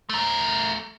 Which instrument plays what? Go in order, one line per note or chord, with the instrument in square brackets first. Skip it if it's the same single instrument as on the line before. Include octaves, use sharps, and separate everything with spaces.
[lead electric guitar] A3 A#4